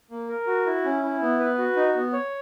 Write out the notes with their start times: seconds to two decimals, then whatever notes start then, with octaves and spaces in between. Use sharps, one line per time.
0.11 A#3
0.29 A#4
0.47 F#4
0.66 E4
0.84 C#4
1.03 E4
1.22 B3
1.40 B4
1.58 F#4
1.76 D#4
1.95 B3
2.13 C#5